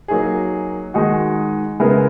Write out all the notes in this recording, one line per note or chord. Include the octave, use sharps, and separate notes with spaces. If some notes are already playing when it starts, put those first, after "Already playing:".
F#3 A#3 D#4 G#4
D#3 G#3 D#4 F#4
C#3 G#3 B3 E4 A#4